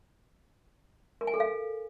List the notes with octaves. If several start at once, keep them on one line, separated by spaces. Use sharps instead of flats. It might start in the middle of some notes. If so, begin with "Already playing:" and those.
A#4
G#5
A4
F5